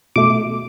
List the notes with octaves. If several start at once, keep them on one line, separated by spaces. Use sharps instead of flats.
B2 A3 D6